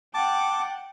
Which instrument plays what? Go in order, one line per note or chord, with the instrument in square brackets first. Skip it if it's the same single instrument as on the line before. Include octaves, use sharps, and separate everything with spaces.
[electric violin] F#5 G5 [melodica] A5 D6